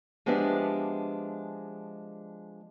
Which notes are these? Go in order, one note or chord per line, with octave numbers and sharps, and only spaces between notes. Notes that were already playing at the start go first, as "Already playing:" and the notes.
F3 G#3 B3 D4 G4 E5